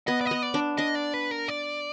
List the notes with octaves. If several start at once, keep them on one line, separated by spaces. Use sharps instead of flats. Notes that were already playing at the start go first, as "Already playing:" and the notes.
B3 D#5
D5
D#5
B3
D5
D4
D4 D#5
D5
B4
A#4
D5